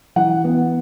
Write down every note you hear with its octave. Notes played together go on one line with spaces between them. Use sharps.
E3 F#5
B3